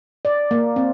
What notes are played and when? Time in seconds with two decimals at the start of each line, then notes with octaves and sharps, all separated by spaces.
0.25 D5
0.51 A#3
0.76 C4